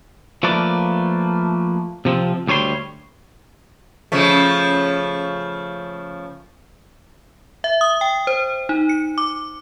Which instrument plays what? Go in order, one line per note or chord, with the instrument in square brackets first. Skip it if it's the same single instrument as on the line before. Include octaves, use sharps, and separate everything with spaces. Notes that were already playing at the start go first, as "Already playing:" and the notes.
[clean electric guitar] F3 A3 A#3 B4 D5
C3 F3 C4
D2 G3 C#5 G#5 C6
[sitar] C#3 F3 A3
[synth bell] E5
D#6
G5
C5
D#4
C#7
D6